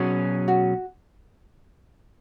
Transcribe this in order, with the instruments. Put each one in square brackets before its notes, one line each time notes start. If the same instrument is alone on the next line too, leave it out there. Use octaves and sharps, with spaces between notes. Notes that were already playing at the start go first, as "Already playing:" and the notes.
Already playing: [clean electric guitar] B2 F#3 C#4 G#4
[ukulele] F#4